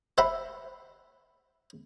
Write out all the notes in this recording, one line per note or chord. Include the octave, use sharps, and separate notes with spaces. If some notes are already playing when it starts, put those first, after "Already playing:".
C5 E5 F#5 A#5 B5